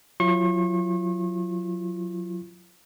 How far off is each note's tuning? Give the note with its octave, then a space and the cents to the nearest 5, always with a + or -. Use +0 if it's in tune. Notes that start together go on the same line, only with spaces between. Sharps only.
F#3 -25 F4 -45 C#6 -40